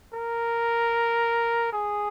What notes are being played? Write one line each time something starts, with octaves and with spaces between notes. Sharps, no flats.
A#4
G#4